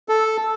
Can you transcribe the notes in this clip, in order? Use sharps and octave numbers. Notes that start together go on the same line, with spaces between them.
A4